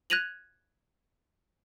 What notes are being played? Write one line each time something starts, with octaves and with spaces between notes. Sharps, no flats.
F#6 G#6 A#6 D#7 F7 F#7